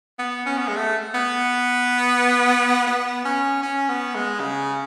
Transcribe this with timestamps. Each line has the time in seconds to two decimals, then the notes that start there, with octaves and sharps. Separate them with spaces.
0.19 B3
0.46 C#4
0.57 B3
0.68 G#3
0.76 A3
1.14 B3
2.87 B3
3.25 C#4
3.62 C#4
3.89 B3
4.14 G#3
4.40 C#3